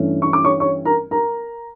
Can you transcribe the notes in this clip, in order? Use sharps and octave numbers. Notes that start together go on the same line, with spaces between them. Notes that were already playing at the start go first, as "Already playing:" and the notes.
Already playing: G2 E3 A3 C#4
C#6
D6
C#5 C#6
C#5 C#6
A#4 A#5
A#4 A#5